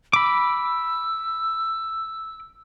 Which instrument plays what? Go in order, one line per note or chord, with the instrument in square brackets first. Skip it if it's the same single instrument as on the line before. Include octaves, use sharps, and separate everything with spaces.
[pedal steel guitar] B5 D6 [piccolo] E6